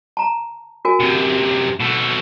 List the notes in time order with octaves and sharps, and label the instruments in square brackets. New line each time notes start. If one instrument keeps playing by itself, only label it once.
[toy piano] A5 A#5
F#4 A#4 G#5
[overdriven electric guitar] F#2 C3
B2 A4